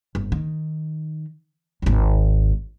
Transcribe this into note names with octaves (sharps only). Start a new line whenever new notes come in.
G1
D#3
G#1 D#2